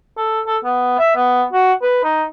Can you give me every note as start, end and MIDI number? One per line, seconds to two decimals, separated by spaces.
0.17 0.40 69
0.47 0.57 69
0.64 0.95 59
0.98 1.13 76
1.15 1.43 59
1.53 1.72 66
1.82 1.99 71
2.03 2.25 63